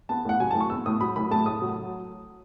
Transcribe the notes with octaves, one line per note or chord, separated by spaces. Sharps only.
B3 A5
A2 F#5
F#3 G#5
A2 A5
C#6
B3 E6
A2 D#6
F#3 B5
A2 B5
A3 A5
A2 D#6
F#3